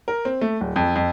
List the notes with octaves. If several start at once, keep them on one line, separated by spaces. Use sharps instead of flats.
A#4
C4
A3
D1
F2
F2